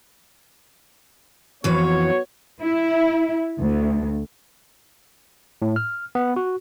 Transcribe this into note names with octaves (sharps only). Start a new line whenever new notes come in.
F2 E3 B3 F#4 C#5 F5
E4
D2
A2
F6
B3
F#4